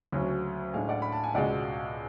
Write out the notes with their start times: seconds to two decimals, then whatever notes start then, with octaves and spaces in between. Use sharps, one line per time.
0.12 D2 C#3 F#3 C#4
0.73 A2 G#3 D4 F5 G#5
0.89 D5 F#5
1.02 B5
1.12 A5
1.24 G#5
1.35 C#2 B2 G#3 D5 F#5